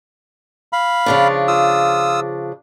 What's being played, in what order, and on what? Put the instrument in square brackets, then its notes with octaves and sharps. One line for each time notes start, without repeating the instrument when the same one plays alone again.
[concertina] F5 B5
[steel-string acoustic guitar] C#3 F3 D4
[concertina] F4 D#6 E6